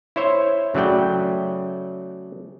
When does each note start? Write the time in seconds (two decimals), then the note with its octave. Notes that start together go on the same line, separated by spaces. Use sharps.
0.16 E4 C5 C#5 E5
0.75 C#3 F#3 A3 D5 G5